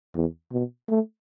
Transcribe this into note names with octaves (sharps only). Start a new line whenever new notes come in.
E2
B2
A3